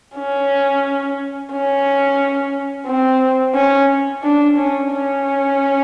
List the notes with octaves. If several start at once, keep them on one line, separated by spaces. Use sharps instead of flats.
C#4
C#4
C4
C#4
D4
C#4
C#4